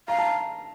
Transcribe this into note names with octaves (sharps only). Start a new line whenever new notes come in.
F5 A#5
A5